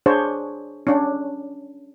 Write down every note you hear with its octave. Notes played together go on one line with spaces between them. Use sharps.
D4 G#4 C5 C#5
C#4 D4